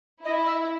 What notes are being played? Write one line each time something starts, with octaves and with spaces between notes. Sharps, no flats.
E4 D#5
E5